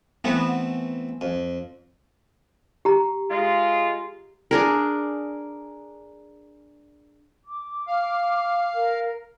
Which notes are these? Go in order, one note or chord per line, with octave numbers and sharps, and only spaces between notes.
E3 A3 B3 C4
F2
G4 A#5
G#3 F4
D4 G#4 A#4
D6
F5
A#4